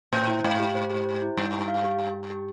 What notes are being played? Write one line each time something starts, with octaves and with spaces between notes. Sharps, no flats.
A2 C5
E4
G#2 F5
G4
C5
G4
C5
E4
G2 E4
G4
F5
G4
G4
G4
G4